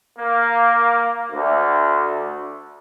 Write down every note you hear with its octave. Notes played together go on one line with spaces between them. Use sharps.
A#3
D2